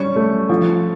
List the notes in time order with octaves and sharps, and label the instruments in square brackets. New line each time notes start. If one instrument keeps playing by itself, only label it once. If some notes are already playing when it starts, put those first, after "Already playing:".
Already playing: [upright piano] G3 C#4 C#6
A3
F3